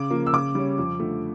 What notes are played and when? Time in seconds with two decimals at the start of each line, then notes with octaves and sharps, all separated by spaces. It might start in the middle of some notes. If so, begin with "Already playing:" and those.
Already playing: C#3 D6
0.10 F3 A#3
0.26 E6
0.33 C#3 D6
0.55 G3 C#4
0.78 F2
1.00 D3 F3 A3